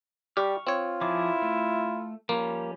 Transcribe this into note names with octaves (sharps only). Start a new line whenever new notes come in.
G3 G4 C#6 F6
C4 F4 C#5
F3 E4 G#4 D6
A3
F3 G3 A#3 C#4